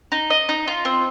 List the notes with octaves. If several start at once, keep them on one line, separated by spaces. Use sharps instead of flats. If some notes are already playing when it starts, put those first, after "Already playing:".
D#4
D#5
D#4
F4
C4